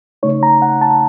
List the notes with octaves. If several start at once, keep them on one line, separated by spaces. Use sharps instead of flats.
C#3 A3 D#4 C#5
A#5
F#5
A5